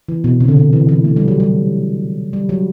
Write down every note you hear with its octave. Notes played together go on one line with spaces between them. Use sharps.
E3
B2
C3
D3
C3
E3
E3
A3
G3
F#3
G3
G3
F#3